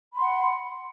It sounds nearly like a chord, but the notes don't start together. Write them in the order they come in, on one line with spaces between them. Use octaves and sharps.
B5 C6 F#5